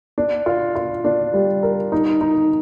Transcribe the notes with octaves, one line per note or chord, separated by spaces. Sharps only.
D4
F4
F4
D4
G3
A#4
D#4
D#4